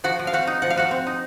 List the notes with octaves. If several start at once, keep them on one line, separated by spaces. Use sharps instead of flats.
F3 F#4 F#5
F3
F5
C4 F#4 F#5
D#4
F3 F#5
F5
F3 F#4 F#5
C4
D#4